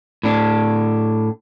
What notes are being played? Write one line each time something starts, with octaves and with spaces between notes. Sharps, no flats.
A2 D4